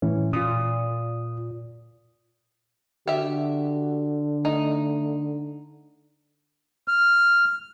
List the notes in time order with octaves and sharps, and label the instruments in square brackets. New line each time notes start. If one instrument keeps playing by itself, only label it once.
[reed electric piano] A2 E3 C#4
[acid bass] A#2 [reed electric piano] F4 D#6
[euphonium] D3 [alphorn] F#4 [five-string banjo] G4 E5
[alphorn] A3 [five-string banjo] D#4
[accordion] F6